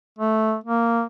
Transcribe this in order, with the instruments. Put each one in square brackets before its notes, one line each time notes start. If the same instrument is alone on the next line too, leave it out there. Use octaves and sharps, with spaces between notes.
[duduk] A3
A#3